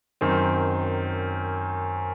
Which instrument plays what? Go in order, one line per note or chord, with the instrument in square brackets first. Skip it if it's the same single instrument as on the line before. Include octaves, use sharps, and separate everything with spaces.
[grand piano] F#2 D#3 C4